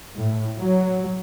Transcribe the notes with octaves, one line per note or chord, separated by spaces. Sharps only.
A2
F#3